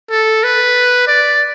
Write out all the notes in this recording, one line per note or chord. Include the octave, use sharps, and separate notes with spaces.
A4
B4
D5